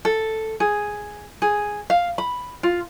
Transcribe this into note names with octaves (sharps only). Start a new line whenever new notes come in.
A4
G#4
G#4
F5
B5
F4